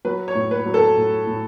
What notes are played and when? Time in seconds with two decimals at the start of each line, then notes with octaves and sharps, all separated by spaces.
0.05 F#3 B4
0.28 C#5
0.35 A2
0.51 B4
0.66 F#3
0.74 A4
0.97 A2
1.27 A2